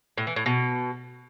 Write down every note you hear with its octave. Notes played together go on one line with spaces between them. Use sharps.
A2
E3
A2
B2